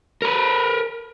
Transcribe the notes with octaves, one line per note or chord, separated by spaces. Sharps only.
A#4 B4